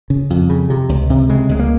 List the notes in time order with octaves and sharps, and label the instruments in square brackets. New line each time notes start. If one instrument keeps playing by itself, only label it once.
[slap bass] C#3
F2
C#3
C3
C#2
C3
C#3 G#3
C#2 G#3
A#3